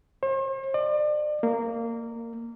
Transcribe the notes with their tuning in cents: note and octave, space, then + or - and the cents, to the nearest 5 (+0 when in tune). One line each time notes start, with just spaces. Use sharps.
C5 +45
D5 +40
A#3 -15